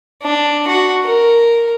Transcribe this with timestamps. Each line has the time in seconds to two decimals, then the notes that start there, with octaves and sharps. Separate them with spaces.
0.23 D4
0.68 F#4
1.05 A#4